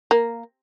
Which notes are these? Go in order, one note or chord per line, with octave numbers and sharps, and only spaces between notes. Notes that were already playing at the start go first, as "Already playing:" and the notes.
A#3